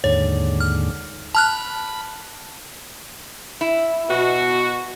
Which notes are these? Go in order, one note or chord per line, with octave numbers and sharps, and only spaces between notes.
D#2 G#2 D3 C#5
F6
A5 B5 F6 F#6
E4
B2 F#4